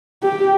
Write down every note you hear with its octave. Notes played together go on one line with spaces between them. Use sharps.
G4